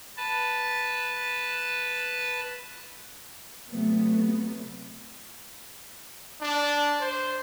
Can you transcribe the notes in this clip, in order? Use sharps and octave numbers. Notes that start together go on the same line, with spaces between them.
B4 A5
C3 F#3 A3 B3
D4
C5